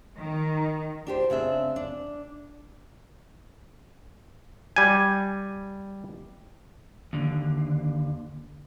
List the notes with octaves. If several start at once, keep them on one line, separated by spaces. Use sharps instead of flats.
D#3
D4 G4 C5
C#3 C4 D4 E5
D4
G3 G#5
D#2 D3